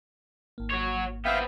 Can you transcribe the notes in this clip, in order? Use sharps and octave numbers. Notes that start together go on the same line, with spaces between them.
G#1 A#3
F#4 C#5
B3 C4 E5 F5 G5